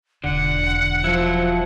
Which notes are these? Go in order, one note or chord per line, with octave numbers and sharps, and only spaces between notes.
E1 D3 F4 F#5
F3 F#3 E4